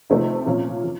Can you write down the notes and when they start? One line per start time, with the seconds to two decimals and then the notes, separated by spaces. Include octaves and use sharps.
0.10 C3 F3 A3 C4 D#4
0.46 A#2 F3 A#3 C#4
0.84 F3